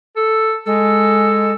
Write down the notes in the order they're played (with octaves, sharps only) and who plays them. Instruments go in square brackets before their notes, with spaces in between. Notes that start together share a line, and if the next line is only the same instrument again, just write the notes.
[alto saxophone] A4
[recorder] G#3 [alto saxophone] A4